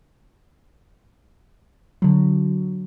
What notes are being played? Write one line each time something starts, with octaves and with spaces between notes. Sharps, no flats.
D3 F#3